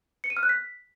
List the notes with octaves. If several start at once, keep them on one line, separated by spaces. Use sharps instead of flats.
C#7
D#7
F6
F#6
B6